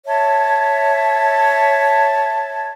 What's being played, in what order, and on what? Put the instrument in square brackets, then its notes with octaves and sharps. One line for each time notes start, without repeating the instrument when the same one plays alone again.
[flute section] C#5 E5 A5 G#6